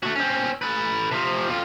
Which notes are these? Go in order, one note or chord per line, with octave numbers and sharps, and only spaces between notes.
A3 F#4
C4 C#4
A4 B4
C3 F3
F2 F4